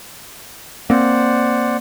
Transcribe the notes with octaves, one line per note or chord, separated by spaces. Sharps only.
A#3 C4 C5 D5 F#5